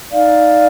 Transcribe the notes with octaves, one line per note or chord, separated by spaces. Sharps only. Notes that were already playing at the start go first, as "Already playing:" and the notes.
D#4 D5 F5